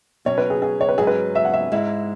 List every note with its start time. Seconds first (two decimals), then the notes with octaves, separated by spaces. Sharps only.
0.25 B2 F#3 C#4 C#5
0.38 B4
0.50 G#4
0.62 G#4
0.81 C#5
0.89 B4
0.98 G#2 F#3 C#4 G#4
1.07 B4
1.35 E5
1.45 F#5
1.53 E5
1.72 G#2 G#3 E4 E5